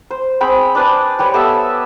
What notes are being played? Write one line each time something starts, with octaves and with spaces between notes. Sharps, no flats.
C5
C4 G#4 G5 B5
D4 B4 C5 D5
G3 G4 B4 C#5
B3 G4 A4 E5